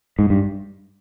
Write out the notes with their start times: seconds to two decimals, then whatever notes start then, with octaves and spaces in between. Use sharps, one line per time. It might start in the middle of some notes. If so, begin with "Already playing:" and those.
0.19 G#2
0.30 G2